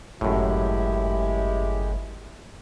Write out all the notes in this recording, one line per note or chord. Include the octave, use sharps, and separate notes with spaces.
G1 F#2 A2 G#3 E4 G4